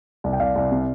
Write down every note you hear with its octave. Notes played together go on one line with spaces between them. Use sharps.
C2
G5
C2 D5 F5
C2
C3